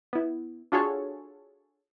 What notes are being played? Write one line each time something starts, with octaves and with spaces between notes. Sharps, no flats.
B3 E4
D4 F4 F#4 G#4 A4 C#5